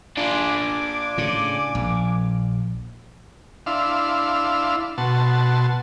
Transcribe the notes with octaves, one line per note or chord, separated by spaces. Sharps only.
D4 F4 G#5 D6
A2 C#3
A#1
D4 E4 F5 C6
B2 F#4 A5 C6